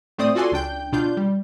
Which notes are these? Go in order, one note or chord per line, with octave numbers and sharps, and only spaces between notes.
A2 A3 C4 C5 D5 D#6
F4 F#4 A4 D5 G#5 C6
C#2 D4 G5 G6
B2 D4 F4 G6
G3